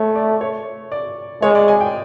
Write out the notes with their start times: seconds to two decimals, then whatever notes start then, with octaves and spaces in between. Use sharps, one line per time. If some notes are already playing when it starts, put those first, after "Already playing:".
Already playing: A3 C#5
0.16 D5
0.41 C#5
0.92 D5
1.42 G#3 C#5
1.55 D5
1.68 G#5
1.81 G5